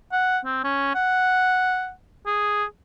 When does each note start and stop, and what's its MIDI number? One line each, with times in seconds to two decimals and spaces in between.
0.12 0.38 78
0.45 0.61 60
0.63 0.90 61
0.95 1.91 78
2.26 2.64 68